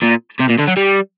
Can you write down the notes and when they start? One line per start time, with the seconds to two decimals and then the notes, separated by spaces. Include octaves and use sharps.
0.02 A#2
0.39 C3
0.49 A#2
0.58 D3
0.67 F#3
0.77 G3